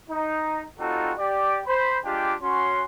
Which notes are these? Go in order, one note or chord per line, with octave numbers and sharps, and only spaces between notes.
D#4
G3 C4 D#4 F4 F#4 A4
G4 D5
C5 B5
G#3 D4 F4 G4
C#4 F#4 C6